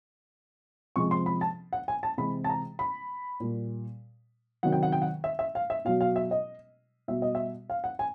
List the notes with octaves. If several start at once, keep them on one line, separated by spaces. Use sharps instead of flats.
C3 F3 G#3 C#6
C6
B5
A5
F#5
G#5
A5
C3 E3 G#3 B5
A5
A#5
B5
A#2 G3
C3 D#3 F#3 F#5
G5
F#5
G5
F#5
E5
E5
F5
E5
B2 F#3 F5
F5
E5
D#5
B2 G3 E5
D#5
E5
F5
F#5
G#5